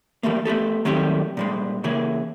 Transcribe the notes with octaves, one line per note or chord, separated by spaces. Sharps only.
E3 F3 G3 A3 A#3
A3 B3 G4 A4
D#3 F#3 G3 A3 C4 G4
A#2 G3 G#3
C#3 E3 A#3 G#4